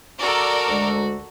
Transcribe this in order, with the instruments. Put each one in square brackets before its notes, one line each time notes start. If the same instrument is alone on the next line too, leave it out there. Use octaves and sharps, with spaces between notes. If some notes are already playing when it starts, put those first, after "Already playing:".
[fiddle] F#4 [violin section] A4 A#4 D5
[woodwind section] D2 G#3